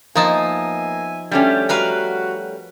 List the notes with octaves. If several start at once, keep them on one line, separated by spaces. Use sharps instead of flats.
F3 A#3 B3 D#4 E5 G#5 A5
G3 A3 C#4 D4 F#4 G4
F#4 A#4 B4 F5